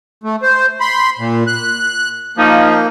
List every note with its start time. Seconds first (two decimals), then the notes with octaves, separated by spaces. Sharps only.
0.24 A3
0.42 C5
0.80 B5 C6
1.19 A#2
1.47 F#6
2.37 F3 A#3 D#4